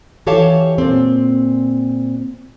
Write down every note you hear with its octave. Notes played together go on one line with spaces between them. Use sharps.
E3 G4 A4 C#5 F5 A5
A#2 C4